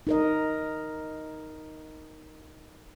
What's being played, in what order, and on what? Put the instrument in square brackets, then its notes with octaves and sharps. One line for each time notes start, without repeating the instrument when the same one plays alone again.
[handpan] D#4 A#4 D#5